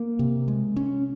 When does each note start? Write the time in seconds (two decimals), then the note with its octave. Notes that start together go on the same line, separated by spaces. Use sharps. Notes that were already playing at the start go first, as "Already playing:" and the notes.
Already playing: A#3
0.19 C3
0.48 G#3
0.76 C#4